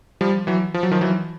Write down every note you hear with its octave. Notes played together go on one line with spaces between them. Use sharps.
F3 G3
E3 F#3
F3
F#3
D#3 F3
E3 F#3